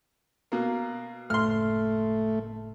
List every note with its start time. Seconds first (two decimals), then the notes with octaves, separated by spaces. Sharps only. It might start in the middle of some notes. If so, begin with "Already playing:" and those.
0.52 B2 A#3
1.30 F#1 A2 A3 C6 F6